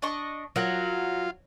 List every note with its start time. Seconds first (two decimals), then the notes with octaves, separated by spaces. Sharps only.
0.02 D4 D#5 C#6
0.56 F#3 F4 A#4 F#5